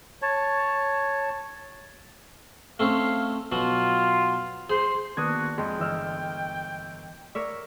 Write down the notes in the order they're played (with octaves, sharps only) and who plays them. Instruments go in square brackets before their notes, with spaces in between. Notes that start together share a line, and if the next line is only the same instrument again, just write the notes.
[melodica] C#5 A5
[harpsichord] A3 C4 C#4 [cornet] F5
[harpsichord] B2 F#3 [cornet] F4
[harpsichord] G#4 [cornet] C5
[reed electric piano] D#3 A#3 B3 [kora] D4 [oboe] F#4 [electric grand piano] D#6 G#6
[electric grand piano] F2 [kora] G#3 [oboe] G5
[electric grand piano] G1 E6 F6 [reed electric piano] E3 D#5
[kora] A#4 C#5 E5 [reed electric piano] D5